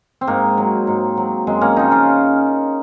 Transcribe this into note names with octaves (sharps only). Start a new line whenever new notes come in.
C4
G#2 A#3
F#3
G#2
F#3
F#2 G#3 C4
A#3 C#4
C#3 F3 C4 D#4
C#4 F4